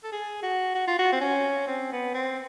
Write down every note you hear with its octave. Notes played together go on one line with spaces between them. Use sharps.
A4
G#4
F#4
F#4
F4
F#4
C4
C#4
C4
B3
C4